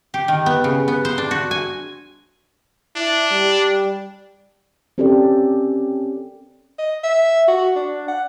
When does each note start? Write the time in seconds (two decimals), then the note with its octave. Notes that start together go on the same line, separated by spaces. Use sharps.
0.14 G4
0.28 D#3
0.46 B3
0.64 C#3
0.88 B3
1.05 C5
1.18 D4
1.31 F#4
1.51 G#5
2.96 D4 E4
3.31 G3
4.98 C4 C#4 G4 A4 A#4 D5
6.78 D#5
7.04 E5
7.48 F#4
7.76 D4
8.08 F#5